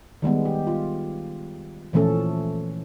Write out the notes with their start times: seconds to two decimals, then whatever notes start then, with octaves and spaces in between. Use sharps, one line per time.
0.22 D#3 G3 G#3 B3
0.45 G4
0.67 F4
1.93 A#2 E3 F3 A3 C#4 A4